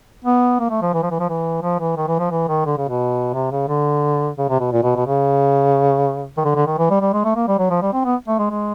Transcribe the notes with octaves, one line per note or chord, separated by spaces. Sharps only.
B3
A#3
A3
F3
E3
F3
E3
F3
E3
F3
E3
D#3
E3
F3
E3
D#3
D3
C#3
B2
C3
C#3
D3
C#3
C3
B2
A#2
B2
B2
C#3
D#3
D3
D3
D#3
E3
G3
G3
G#3
A3
A#3
G3
F#3
F3
G3
C4
B3
A3
G#3
G#3